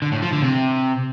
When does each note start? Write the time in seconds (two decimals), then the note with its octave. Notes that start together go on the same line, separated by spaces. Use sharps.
0.02 D3
0.12 A2
0.22 F3
0.32 D3
0.42 C3